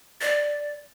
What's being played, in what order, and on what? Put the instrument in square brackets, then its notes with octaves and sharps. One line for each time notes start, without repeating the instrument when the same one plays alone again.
[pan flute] D5